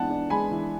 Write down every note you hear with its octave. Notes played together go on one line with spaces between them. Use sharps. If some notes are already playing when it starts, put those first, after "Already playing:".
Already playing: E3 G#3 B3 D4 F#5 A5
D4
G#3 G#5 B5
E3